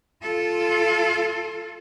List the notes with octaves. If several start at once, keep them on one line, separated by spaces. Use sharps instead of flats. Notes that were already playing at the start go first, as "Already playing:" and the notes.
F4 A4